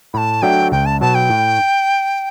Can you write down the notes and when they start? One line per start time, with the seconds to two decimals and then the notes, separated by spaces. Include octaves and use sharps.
0.14 A2 A5 B5
0.42 F#3 A3 D4 F#4 G5
0.72 C#2 G5
0.86 A5
1.01 B2 F#3 A5
1.15 G5
1.30 A2